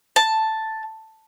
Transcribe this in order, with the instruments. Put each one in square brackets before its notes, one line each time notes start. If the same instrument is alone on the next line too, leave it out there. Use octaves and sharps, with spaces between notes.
[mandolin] A5